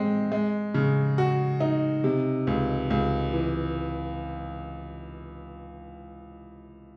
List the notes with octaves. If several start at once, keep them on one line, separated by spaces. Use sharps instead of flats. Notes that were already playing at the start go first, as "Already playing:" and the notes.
Already playing: G#3 C4
G#3
C#3
F#4
D#4
C3
C#2
C#2
E3